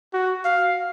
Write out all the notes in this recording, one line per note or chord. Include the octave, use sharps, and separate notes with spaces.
F#4
F5